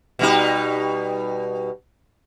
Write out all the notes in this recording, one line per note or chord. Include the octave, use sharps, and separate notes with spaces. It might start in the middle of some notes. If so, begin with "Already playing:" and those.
B2 G3 D#4